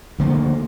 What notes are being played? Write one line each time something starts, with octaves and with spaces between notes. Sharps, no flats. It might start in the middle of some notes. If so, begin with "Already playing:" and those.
D2 D3 F3 A#3